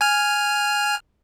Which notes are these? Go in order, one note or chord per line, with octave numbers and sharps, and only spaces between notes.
G#5 F6